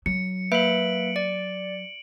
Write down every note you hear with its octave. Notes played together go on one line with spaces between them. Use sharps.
F#3 C#7
A#3 B4 E5 D7 F#7
D5